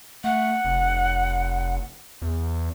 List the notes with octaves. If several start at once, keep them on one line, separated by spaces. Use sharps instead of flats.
A3 F#5
F1
E2